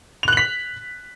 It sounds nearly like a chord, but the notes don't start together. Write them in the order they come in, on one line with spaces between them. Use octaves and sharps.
F7 F#6 F#7 B6